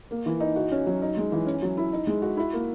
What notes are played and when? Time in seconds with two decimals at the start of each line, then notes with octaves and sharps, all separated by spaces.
0.11 A#3
0.26 E3
0.40 D#4
0.56 F#4
0.71 C#4
0.87 F#3
1.02 D#4
1.17 G#3
1.32 E3
1.46 C#4
1.62 F#3
1.77 E4
1.92 D#4
2.07 G#3
2.22 F#4
2.37 E4
2.53 A#3